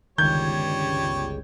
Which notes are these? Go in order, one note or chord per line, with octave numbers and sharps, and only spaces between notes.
G1 C#2 D#3 G3 C#5 G6 G#6